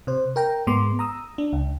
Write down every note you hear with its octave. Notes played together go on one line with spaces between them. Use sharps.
C3 C5
A#4 G5 A#5
G#2 G#3 B3 C6 D6
A#5 D#6 E6
D4
C#2